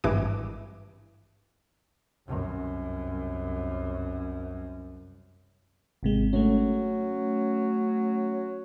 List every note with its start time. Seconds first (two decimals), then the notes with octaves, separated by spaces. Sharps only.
0.04 G#1 G2 E3 D6
2.27 C2 F#2
6.03 G#1 C3 G#3
6.33 F#3 A3 C#4